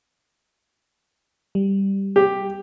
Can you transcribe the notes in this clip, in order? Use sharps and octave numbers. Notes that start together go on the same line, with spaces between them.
G3
G4